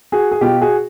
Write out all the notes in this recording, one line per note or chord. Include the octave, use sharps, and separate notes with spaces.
F#4 G#4
G#4
B2 F4 G4
F#4 G#4